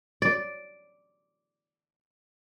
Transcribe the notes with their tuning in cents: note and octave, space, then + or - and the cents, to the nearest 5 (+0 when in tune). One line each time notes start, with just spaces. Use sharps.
D5 -5